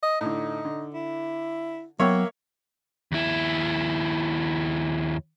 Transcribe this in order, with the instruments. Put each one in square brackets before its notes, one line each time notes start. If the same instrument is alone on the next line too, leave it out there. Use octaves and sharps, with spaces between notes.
[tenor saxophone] D#5
[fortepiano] A2 D3 [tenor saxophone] D#4
[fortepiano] D3
[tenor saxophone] E4
[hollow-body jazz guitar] F#3 B3 G5 [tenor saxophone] A#3 [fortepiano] C#5 E5 C#6
[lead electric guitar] D#2 E4